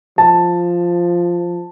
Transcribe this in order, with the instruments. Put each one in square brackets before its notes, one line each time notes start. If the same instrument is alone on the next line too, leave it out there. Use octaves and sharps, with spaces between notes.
[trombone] F3 [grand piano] A5